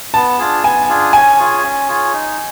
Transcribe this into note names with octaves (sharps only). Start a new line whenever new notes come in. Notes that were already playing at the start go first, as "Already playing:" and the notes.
B3 A5
D4 F4 G#4
B3 G#5
D4 F4 G#4
C#4 G#5
F4 G#4 C#5
C#4
F4 G#4 C#5
D#4